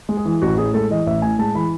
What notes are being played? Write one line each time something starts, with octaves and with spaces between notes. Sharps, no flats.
G#3
G#4
E3
A1 F#4
A2 G#4
G#3 A4
E3 D#5
A1 E5
A2 G#5
G#3 A5
E3 B5